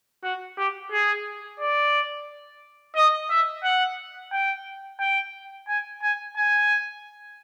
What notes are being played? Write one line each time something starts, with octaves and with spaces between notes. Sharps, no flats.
F#4
G4
G#4
D5
D#5
E5
F#5
G5
G5
G#5
G#5
G#5